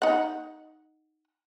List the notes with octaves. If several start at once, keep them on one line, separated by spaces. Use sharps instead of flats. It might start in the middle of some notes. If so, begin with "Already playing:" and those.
D#4 F#5